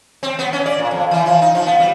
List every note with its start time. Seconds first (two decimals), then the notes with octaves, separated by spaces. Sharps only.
0.23 C4
0.39 B3
0.53 C#4
0.66 D5
0.79 A#2
0.91 F2
1.11 E3
1.26 F3
1.42 D#4
1.55 F3
1.66 B3
1.80 G3